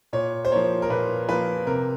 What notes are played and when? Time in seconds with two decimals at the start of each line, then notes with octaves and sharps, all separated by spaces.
0.13 A#2 C#5
0.45 C5
0.52 F3 A#3 C#5
0.82 A#4
0.90 A#2 B4
1.29 F3 A#3 B4
1.67 C3 A#4